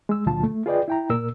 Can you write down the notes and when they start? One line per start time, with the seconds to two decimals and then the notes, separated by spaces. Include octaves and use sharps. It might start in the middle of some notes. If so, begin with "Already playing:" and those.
0.09 G#3 E6
0.26 C#2 A#2 D3 F#3 F4 A5
0.43 A3
0.66 F4 G#4 B4 D5 D#5 G5
0.88 E4 G5 A#5
1.10 A#2 A#4 E6